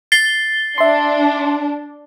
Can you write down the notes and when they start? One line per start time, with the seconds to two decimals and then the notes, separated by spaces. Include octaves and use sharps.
0.12 A6 C7 G7
0.78 D4 E5 C6